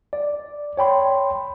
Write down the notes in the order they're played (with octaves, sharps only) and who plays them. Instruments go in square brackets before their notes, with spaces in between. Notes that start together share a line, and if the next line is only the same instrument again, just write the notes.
[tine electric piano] D5
C#5 G5 B5 C6